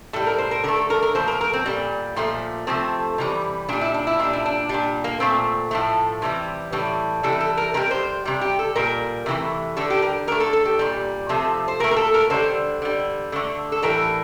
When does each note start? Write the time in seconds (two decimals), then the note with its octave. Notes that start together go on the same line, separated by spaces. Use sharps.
0.13 A2 G3 A4
0.27 A#4
0.39 C5
0.51 A#4
0.64 D3 A#4
0.68 A3
0.77 A4
0.90 A#4
1.03 A#4
1.15 A#2 F3 A3 C5
1.28 A#4
1.41 A#4
1.53 C4
1.66 A#2 G3
2.16 A#2 F3 A3
2.67 C3 F3 A3 C4
3.18 C3 E3 G3
3.69 A#2 G3 D4
3.81 E4
3.94 D4
4.07 E4
4.19 A#2 G3 D4
4.33 E4
4.46 D4
4.69 A#2 G3 D4
5.04 A#3
5.20 A#2 A3 C4
5.71 A2 F3 A3
6.22 C3 E3 G3
6.72 A2 E3 G3
7.23 C3 E3 G3 A4
7.41 A4
7.57 A#4
7.74 C3 G3 A#4
7.91 C5
8.25 C3 G3
8.41 G4
8.59 A4
8.75 A#2 G3 A#4
9.26 C3 E3 A3
9.77 D3 G3 A4
9.90 G4
10.02 A#4
10.27 D3 A#4
10.32 A3
10.40 A4
10.53 A4
10.66 G4
10.79 A#2 G3
11.29 C3 F3 A3
11.68 C5
11.80 A#2 A#4
11.84 A3
11.91 A#4
11.96 A4
12.14 A#4
12.30 D3 G3 C5
12.82 D3 G3
13.32 D3 A3
13.72 A4
13.83 A2 E3 G3 A#4